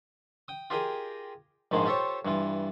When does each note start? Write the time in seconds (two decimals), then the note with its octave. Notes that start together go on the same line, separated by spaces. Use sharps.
0.48 G5 D#6
0.70 F4 G4 G#4 A#4 D#5 G5
1.71 A#1 G#2 D#3 F3 G#4 C5
1.86 F4 G4 A4 C5 C#5
2.25 G2 E3 F4